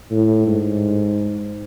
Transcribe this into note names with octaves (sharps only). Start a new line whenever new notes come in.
A2
G#2